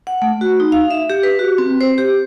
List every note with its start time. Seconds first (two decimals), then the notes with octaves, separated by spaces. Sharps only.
0.07 F#5
0.22 A3
0.41 F#4
0.60 D#4
0.72 F5
0.91 E5
1.10 G4
1.23 B4
1.39 F#4
1.58 C4
1.81 C5
1.98 G4